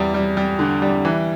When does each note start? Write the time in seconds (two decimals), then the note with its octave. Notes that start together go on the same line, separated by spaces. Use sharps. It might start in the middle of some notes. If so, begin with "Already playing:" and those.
Already playing: E2 G3
0.14 G3
0.37 G3
0.59 D3
0.82 G3
1.05 E3